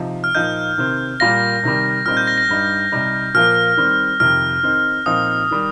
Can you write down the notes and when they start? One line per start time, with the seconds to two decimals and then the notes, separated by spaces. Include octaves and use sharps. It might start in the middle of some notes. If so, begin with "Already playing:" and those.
Already playing: C3 F3 D#4
0.24 F6
0.35 A#2 F3 D#4 G6
0.78 C3 D#3 C4
1.20 A#2 G3 A#3 F4 A#6
1.63 C3 D#3 G3
2.06 A#2 G3 C4 D#4 F6
2.17 G6
2.27 A#6
2.38 A#6
2.49 G2 G3 D#4
2.92 C3 G3 D#4
3.34 A#2 F3 A#3 F4 F6
3.77 D#3 G3 C4
4.20 F2 C3 D#3 F6
4.63 D#3 C4 D#4
5.06 A#2 F3 C4 D#4 D#6
5.51 D#3 G3